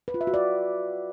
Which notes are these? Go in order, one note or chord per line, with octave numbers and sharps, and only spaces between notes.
B4
F4
E5
F#4
D5